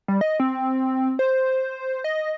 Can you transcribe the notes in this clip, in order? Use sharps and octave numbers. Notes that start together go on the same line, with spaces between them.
G3
D#5
C4
C5
D#5